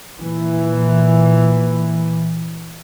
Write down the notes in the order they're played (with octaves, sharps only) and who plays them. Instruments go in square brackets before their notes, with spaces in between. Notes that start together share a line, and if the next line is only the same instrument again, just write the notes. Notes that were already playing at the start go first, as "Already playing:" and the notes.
[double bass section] A#2 E3